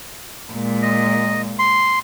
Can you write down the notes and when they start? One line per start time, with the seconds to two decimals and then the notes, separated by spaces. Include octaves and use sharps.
0.52 A#2 G#3
0.82 D#5
1.59 C6